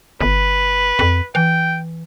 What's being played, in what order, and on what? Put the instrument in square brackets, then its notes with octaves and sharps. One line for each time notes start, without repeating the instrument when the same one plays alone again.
[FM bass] G1 [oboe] B4
[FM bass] F2
[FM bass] E3 [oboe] G5